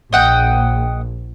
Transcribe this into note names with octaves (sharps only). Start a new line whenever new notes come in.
A#1 D#5 F#5 G5